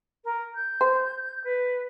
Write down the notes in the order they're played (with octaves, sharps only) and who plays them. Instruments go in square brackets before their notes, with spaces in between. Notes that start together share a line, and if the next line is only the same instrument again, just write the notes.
[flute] A#4
G6
[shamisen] C5
[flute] B4